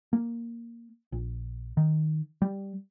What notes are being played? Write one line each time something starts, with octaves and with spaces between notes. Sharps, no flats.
A#3
A#1
D#3
G3